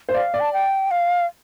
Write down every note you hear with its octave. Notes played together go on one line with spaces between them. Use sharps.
C5
D5 F5
D5
A5
G5
F5